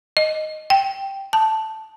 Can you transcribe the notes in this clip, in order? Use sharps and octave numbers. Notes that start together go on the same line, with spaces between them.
D#5
G5
A5